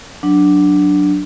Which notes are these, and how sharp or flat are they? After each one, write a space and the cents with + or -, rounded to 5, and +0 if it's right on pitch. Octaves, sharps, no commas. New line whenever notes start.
F#3 +0 D4 +0